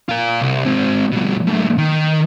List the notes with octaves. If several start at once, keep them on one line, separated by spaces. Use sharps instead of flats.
F4 A#4
C2
G#2 C4
G2 B2
F#2 A2
D#3